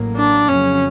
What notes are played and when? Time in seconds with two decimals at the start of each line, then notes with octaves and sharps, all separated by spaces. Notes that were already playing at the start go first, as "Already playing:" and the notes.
Already playing: A1 A2 F#3 A#3
0.16 D4
0.49 F2 C#3 F#3 C#4